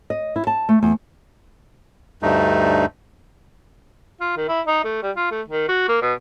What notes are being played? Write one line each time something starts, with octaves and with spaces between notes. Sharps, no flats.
D#5
E4
A5
A3
E2
D2 G2 A3 D#4
F4
D#3
E4
D#4
A3
G3
F4
A3
D#3
F#4
A#3
B2